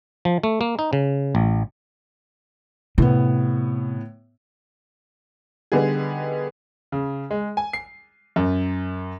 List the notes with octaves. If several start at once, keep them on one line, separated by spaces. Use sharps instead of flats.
F3
A3
A#3
D#4
C#3
A1
A2 C3 B3
D3 G3 B3 D#4 G#4
C#3
G#3
G#5
C7
F#2